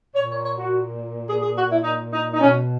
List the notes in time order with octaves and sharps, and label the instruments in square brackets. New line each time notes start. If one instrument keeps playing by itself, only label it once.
[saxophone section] A#2 C#5
C#5
C#5
F#4
G#4
G#4
F#4
E4
D#4
D#4
D#4
B2 C#4